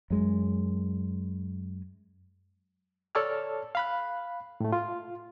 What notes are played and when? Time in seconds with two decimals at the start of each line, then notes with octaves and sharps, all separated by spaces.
0.10 F#2 G#3
3.15 A4 C#5 D5 A5 E6 F6
3.75 F5 B5 F#6
4.60 A2 A3
4.73 F4